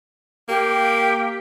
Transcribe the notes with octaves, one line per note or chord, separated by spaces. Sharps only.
A#3 G4 G5